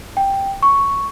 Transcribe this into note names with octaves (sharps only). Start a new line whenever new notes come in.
G5
C#6